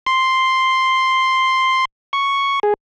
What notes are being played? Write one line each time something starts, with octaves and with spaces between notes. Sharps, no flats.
C6
C#6
G#4